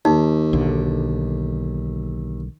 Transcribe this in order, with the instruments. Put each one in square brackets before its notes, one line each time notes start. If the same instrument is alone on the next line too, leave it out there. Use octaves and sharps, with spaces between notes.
[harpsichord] D#2 [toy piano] D#4
[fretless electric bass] B1 D3